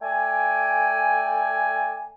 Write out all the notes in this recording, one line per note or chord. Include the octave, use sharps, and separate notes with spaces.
A3 D5 G5 G#5